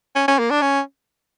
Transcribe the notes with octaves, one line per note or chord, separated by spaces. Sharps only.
C#4
C#4
A#3
D4
C#4